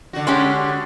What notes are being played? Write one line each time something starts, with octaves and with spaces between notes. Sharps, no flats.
D3 F#4
G#3 C#4 G4